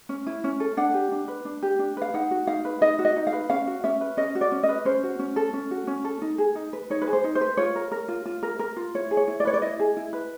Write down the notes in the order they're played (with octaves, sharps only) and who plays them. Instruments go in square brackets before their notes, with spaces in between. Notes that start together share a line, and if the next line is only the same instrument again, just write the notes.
[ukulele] C#4
E4
C#4
A4
D4 F#5
G4
D4
B4
D4
G4
D4
B4 F5
D#4 F#5
F#4
D#4 F5
B4
D#4 D#5
F#4
D#5
D#4
F5
B4
C#4 F5
F#4
C#4 E5
B4
C#4 D#5
F#4
D5
C#4
D#5
B4
C#4 C5
F#4
C#4
A4
C#4
F#4
C#4
A4
D#4
G#4
D#4
B4
D#4 C#5
B4
G#4
C5
D#4
C5
B4
F4 C#5
A#4
A#4
F4
F4
A#4
A#4
F4
E4 C#5
G#4
C#5
E4
D5
B4 C#5
D5
E4 D#5
G#4
E4
B4